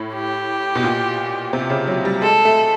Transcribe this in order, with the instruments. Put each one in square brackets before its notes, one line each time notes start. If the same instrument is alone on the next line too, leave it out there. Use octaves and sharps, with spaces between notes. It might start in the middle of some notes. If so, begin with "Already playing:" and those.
Already playing: [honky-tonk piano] A2
[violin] G4
[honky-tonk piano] B2
A#2
C3
C#3
F#3
G3
[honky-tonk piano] G#3 [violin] A4
[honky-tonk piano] A3